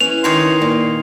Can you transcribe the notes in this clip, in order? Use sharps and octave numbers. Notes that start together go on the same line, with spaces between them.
E3 C#4 F7
D#3 C#5 A#5 C6
A#2